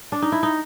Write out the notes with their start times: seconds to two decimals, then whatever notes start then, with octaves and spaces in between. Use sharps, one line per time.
0.12 D4
0.22 D#4
0.32 E4
0.43 D#4